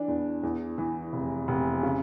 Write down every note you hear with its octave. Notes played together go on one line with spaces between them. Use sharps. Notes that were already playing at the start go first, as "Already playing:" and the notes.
Already playing: E3 D4
E2
E2
E3
F1
F1
C#3